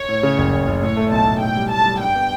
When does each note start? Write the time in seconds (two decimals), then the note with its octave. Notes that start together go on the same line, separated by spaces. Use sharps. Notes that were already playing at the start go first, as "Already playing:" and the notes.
Already playing: C#5
0.09 A2
0.23 C#3
0.38 F#1
0.53 F#1
0.67 F#1
0.82 A2 C#5
0.97 A3
1.11 B1 A5
1.27 B1
1.41 A2 G5
1.56 G3
1.71 A2 A5
1.86 G3
2.00 G2 G5
2.15 B3